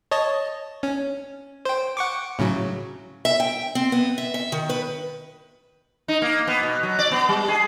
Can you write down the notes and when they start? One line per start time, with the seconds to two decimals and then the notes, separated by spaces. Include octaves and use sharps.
0.11 C#5 D#5 A5
0.83 C#4
1.65 C5 G5
1.97 F#5 C#6 D6
2.39 A2 C#3 F#3
3.25 E5
3.40 G5
3.75 C4
3.92 B3
4.18 E5
4.34 E5
4.52 D#3
4.69 B4
6.08 D#4
6.22 A#3
6.47 B3
6.63 B2
6.83 F#3
6.99 D5
7.11 B3
7.29 G3
7.48 G#4